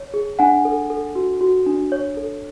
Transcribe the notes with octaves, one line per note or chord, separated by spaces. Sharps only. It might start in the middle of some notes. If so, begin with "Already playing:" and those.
Already playing: C#5
G#4
D4 F#5 G#5
A4
A4
F#4
F#4
D4
C#5
A4